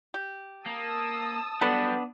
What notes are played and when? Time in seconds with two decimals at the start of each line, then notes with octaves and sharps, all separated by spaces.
0.14 G4
0.66 A#3 A5 D#6 E6
1.61 F#3 G3 B3 D4 A4 B4 F#5